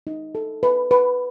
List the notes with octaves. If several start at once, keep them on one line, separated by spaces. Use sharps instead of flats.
D#4
A4
B4
B4